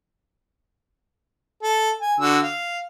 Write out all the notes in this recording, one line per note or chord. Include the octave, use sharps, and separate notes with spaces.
A4
G#5
D3 F#4 E6
F5